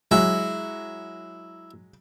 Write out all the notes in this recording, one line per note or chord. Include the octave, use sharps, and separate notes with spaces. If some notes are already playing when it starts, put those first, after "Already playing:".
F#3 G#3 E4